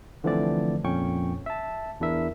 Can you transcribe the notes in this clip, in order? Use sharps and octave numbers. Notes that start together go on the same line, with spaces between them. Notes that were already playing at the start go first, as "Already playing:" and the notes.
D3 E3 F3 A3 C4 D5
F2 A#2 C#4 G5 C#6
E5 A5
E2 D4 E4 A#4 E5